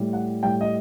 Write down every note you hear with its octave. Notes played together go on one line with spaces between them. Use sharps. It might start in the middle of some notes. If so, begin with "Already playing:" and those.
Already playing: A2 G3
F#5
A2 G3 G5
D#5